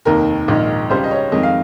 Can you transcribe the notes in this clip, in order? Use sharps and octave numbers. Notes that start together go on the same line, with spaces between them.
F1 D#2 D#3 A#4
A#1 G#2 D#3
C#2 C#3 G3 C5
D#5
C#5
F2 D#3 G#3 D#5
F5